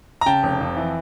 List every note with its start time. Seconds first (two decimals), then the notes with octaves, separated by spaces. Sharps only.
0.21 A#5
0.26 C#3 G5 A5
0.43 F1
0.61 F2
0.77 E3